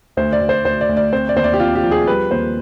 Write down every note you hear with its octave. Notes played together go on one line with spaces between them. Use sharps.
D2 C5
D5
D2
C5
D2 C5
D5
D2
D5
C4 C5
D5
D#2 C5
D5
G4
C4 F4
G4
F3
G#4
G3 B4
D#2 C5